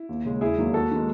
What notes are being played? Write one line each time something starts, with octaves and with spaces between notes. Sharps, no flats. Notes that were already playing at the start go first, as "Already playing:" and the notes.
Already playing: E4
D#2
C#3 G#3
E1 E4 G#4
D#2 D#3 F#3
D#2 F#4 A4
D#3 G#3